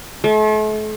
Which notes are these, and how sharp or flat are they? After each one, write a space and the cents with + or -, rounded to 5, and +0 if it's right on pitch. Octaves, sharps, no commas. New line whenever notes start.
A3 -40